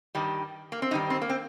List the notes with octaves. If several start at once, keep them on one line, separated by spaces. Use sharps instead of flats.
G2 D#3 G3
A#3
C4
G2 D#3 G3 D#4
C4
A#3
C4